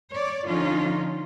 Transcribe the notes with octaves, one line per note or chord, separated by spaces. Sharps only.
C#5 D5
D3 F3 C#4 D#4 F4